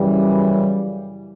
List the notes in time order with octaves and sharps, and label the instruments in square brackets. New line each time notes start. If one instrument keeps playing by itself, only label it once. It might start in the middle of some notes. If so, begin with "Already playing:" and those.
Already playing: [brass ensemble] F#2 C#3 E3 G3